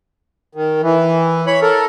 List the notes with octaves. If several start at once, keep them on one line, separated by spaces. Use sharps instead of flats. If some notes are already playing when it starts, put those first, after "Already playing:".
D#3
E3
C#5 B5
A4 A#4